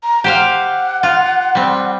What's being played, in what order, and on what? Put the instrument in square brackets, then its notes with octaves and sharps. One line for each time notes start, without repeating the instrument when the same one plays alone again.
[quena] A#5
[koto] G4 C5 F5 [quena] F#5
[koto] F4
G3 C4